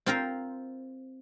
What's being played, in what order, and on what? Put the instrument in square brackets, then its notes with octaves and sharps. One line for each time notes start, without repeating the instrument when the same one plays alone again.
[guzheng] C4 F4 A#4 C5